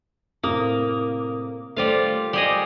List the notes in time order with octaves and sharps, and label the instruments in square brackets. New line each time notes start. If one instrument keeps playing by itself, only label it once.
[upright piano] A2 C3 D#6 [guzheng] A#3
[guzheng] G3 F4 F5 [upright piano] A3 C5
[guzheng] G3 G#4 D#5